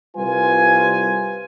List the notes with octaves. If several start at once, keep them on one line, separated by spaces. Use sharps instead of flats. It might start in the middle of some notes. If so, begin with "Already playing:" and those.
C2 G3 F4 B4 G#5